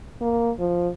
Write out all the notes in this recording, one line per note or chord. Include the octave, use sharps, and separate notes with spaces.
A#3
F3